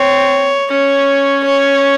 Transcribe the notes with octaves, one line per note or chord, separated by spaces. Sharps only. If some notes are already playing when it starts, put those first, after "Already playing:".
Already playing: C4 C#5
C#4 C#5
C#5